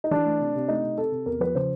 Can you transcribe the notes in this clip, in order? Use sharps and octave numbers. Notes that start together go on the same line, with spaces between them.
D#4
E3 D4
A3
C3
C3
A3 D#4
C3
C3 A4
C3
E2 A#4
F3 B4
C#3 C5